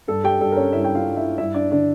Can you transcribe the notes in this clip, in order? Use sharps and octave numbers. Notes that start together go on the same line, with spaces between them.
G2 A4
G4 G5
G2 A4
A#4
C#4 C#5
G2 E4 E5
G5
F4 F5
G3
E4 E5
G2 E4 E5
D4 D5
D3 D4 D5